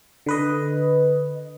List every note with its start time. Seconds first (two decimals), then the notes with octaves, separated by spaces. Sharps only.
0.26 D3 B4 D#5